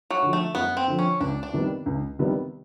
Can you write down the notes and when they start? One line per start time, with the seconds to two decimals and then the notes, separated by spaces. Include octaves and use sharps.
0.11 F#3
0.22 D3 F3
0.33 A3
0.55 F#2 B3
0.77 C4
0.88 D3 F3
0.99 C#4
1.20 C#2 D4
1.43 D4
1.53 C3 D#3 G3 B3
1.86 C#2
2.19 C3 D#3 G3 B3